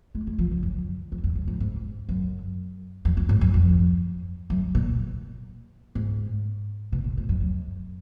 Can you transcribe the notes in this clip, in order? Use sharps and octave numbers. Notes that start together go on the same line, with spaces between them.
G#3
G#3
F3
D3
F#2
F2
F2
F#2
G#2
G#2
F#2
F2
F#2
G#2
F#2
F2
F#2
A#2
G#2
B2
A#2
G#2
F#2
F#2